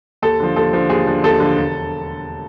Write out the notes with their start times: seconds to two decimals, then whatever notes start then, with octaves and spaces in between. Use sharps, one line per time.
0.22 D#2 A4
0.40 D3 F3
0.56 D#2 A4
0.73 D3 F3
0.89 D#2 G#4
1.07 D3 F3
1.23 D#2 A4
1.40 D3 F3
1.57 E1